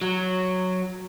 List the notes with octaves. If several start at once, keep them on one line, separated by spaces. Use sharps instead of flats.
F#3